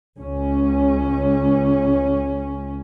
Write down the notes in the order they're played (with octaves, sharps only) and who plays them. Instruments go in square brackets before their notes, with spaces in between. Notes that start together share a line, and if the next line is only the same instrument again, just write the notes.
[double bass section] C#2 C#4